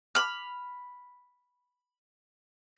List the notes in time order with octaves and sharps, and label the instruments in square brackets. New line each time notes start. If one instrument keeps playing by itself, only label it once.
[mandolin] B5 F6